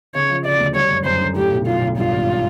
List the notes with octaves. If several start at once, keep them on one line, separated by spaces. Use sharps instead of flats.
C#3 C#5
F3
C#3 D5
D2
G3 C#5
F#2
F#2 C5
D3
A2 G4
B1
B1 F4
B1
G2 F4
G#1